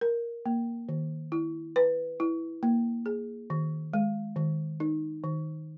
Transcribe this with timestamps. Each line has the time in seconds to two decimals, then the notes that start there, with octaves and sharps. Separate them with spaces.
0.01 A#4
0.46 A#3
0.89 D#3
1.32 E4
1.76 B4
2.20 E4
2.63 A#3
3.06 G#4
3.50 D#3
3.94 G#3
4.36 D#3
4.80 D#4
5.24 D#3